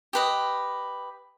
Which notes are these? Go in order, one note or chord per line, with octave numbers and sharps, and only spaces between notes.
G4 B4 D#5